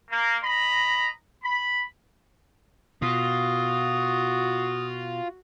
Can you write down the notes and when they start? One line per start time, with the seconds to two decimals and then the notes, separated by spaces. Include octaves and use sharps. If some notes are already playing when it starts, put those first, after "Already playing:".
0.11 A#3
0.42 D#5 A#5 B5
1.43 B5
3.02 B2 F4 F#4 D#6